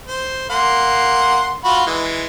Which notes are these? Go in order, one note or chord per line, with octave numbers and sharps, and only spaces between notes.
C5
A#3 F#5 C6
F4 F#4 B5
E3 G#3